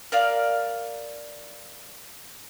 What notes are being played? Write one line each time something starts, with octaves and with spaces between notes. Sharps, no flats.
A#4 D5 F5